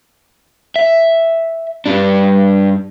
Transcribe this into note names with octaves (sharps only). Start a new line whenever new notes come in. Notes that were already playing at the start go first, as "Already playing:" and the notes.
E5
G2 D4